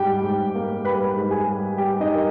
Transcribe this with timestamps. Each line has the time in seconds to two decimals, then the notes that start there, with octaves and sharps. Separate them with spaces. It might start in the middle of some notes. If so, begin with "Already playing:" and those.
Already playing: G#2 G3 G4 G5
0.24 G#2
0.55 A#3
0.85 G3 B4 B5
1.16 G#2
1.31 G#4 G#5
1.47 G3
1.77 G3 G4 G5
2.00 D#4 D#5
2.09 G3
2.15 A#4